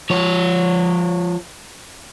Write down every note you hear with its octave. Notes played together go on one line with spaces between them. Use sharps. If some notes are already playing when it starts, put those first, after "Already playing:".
F3 C#5